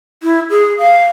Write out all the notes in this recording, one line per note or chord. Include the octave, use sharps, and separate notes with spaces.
E4
G#4
F5